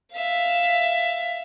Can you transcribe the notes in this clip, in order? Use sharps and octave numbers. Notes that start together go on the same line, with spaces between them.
E5 F5